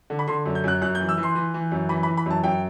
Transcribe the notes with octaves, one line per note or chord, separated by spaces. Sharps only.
D3
B5
D3 C6
F#2
G6
F#2 F#6
F#2 F#6
G6
E3
E6
E3
C6
E3
E3
F#2
E3 B5
B5
E3
B5
F#2 A5
F#2 G5